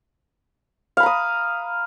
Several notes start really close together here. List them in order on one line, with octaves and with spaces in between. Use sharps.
F5 B5 A#5 D#6